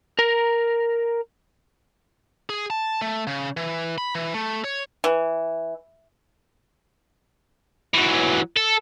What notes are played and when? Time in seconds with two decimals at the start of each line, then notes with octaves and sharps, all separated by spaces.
0.19 A#4 A#5
2.50 G#4
2.70 A5
3.02 A3
3.27 C#3
3.57 E3
3.98 B5
4.15 E3
4.34 A3
4.64 C#5
5.04 E3
7.94 E3 F#3
8.57 A4